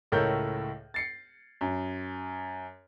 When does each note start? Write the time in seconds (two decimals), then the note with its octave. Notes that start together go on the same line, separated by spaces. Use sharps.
0.12 C#2 A2 A4 A#4 C#5 G6
0.94 A6 C7 C#7
1.61 F#2